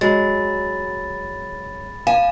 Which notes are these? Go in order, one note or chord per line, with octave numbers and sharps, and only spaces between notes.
F#3 G#3 B5 A6
F5 G#5 E7